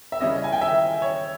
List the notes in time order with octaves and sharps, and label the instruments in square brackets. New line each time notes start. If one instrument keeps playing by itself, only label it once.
[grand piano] E5
C#3 G3 C#4 E4 D#5
G#5
G5
E5
C#5